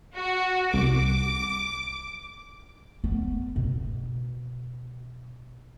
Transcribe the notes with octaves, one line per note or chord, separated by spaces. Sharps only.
F#4
C2 D6
B3
B2